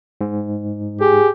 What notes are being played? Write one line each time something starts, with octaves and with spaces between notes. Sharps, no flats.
G#2
G4 G#4